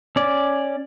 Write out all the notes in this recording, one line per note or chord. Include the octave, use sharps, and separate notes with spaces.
C#4 D5